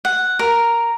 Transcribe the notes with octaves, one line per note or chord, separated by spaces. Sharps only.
F#5
A#4